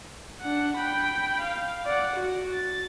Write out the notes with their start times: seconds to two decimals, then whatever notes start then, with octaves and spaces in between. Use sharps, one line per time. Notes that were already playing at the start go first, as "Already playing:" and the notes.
0.41 D4 F#5
0.77 G5 B5
1.41 F5
1.85 D5 F#5
2.16 F#4
2.53 A6